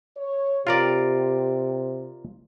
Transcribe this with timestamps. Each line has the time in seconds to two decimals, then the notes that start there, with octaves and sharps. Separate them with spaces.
0.17 C#5
0.67 C3 F4 G4 A#4 D5